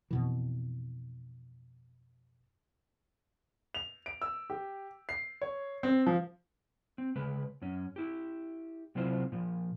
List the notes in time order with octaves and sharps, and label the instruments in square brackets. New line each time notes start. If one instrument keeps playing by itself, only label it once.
[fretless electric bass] F2 B2 E3
[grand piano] F7
D7
E6
G4
C7
C#5
C4
F3
[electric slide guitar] C4
C#3 G#3 B4
F#2 C#4
E4 G4
C3 F#3 C4 E4 F4 C5
A#2 F3